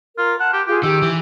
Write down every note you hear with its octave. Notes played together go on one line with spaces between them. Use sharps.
F4 A#4
F#5 A5
G4
F4 G4 G#4 F5
D#3 G4 E6
E3